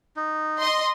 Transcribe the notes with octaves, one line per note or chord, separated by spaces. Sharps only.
D#4
D#5 C6